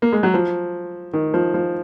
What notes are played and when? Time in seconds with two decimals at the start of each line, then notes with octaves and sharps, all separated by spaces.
0.02 A#3
0.13 G#3
0.23 F#3
0.34 F3
1.13 D#3
1.34 F3
1.54 F3